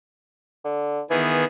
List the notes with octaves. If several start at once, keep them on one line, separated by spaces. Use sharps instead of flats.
D3
D#3 E3 B3 G#4